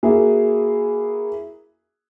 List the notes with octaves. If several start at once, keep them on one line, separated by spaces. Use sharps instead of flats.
A#3 E4 F#4 G#4